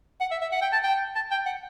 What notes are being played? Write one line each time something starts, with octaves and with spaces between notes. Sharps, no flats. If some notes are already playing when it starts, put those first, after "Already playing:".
F#5
E5
E5
F#5
G5
A5
G5
A5
G5
F#5